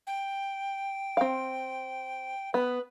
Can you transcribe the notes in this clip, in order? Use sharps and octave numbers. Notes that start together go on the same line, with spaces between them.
G5
C4 F5
B3 B4